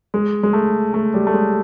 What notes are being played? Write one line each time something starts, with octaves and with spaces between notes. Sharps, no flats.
G#3
G#3
A3
A3
G3
A3
G#3